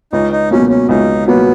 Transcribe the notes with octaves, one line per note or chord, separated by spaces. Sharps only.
C#2 D#4
D#4
B2 F#3 A#3 C#4
C#4
C#2 D#4
B2 F#3 A#3 B3